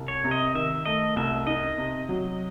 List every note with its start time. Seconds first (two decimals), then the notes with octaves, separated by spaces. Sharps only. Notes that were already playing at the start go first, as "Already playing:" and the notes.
Already playing: C2
0.08 C#5
0.24 C3
0.31 D#5
0.55 D#3 E5
0.86 A3 D#5
1.16 C2 E5
1.47 D#4 D#5
1.78 C3
2.09 F#3